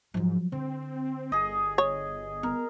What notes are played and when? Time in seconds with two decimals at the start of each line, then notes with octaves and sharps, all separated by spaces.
0.14 G#2 F3 F#3
0.52 D3 C4
1.32 G1 G#4 D#5
1.78 C#5
2.43 B3 A#4